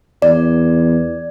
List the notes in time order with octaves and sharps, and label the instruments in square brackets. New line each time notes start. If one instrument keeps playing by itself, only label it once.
[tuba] E2 [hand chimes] D5